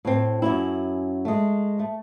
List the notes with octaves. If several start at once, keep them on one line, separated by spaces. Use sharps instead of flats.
A2 C4
F#2 C#4 E4
G#3 A3
A3